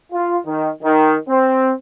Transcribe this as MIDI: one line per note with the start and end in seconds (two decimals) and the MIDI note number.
0.13 0.38 65
0.46 0.69 51
0.83 1.16 51
1.29 1.72 60